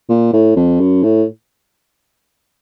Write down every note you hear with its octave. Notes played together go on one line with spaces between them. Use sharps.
A#2
A2
F2
F#2
A2